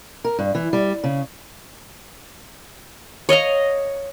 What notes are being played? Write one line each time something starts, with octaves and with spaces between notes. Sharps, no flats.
A#4
G2
E3
G3
C#3
C#5 D#5 F5 A#5